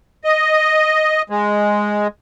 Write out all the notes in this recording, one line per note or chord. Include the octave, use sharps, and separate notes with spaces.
D#5
G#3